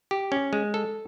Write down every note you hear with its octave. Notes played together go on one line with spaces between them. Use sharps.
G4
C#4
G#3
A4